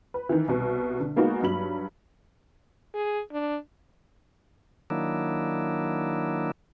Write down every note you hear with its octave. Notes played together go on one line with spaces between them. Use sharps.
B4
D#3 E3
C2 B2
D3
G#3 A#3 B3 D#4 F#4
G2 F#3 B5 F#7
G#4
D4
D#3 F#3 A#3 D4 E4